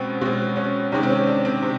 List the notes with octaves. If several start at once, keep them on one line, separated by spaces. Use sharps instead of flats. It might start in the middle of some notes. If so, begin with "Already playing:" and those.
Already playing: B2 G#3 C4 C#4
B2 G#3 C4
C#4
C3 D#3 G#3 C#4
C4
C#4
D4
C4
C3 D#3